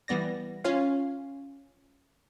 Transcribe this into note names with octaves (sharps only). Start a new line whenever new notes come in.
E3 G3 B3 D5 A#6
C#4 F4 C#5 F5